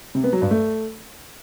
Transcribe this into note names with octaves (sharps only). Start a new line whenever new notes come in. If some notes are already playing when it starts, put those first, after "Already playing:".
C3
B3
F#3
G2
A3